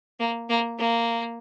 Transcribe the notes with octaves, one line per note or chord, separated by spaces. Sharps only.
A#3
A#3
A#3